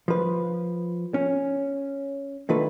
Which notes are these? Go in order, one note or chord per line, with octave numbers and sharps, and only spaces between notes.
F3 B4
C#4
D3 D#3 A3 F4 B4